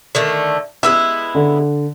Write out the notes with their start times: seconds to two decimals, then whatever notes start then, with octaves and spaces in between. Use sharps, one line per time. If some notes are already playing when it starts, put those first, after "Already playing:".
0.15 D3 D#3 A3
0.83 G#3 B3 E4 E6
1.35 D3